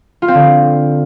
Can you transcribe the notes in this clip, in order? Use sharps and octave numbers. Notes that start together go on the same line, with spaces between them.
F4
C4
D3